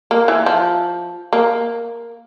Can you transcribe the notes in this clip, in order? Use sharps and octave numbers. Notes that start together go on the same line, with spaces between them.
A#3
E3
F3
A#3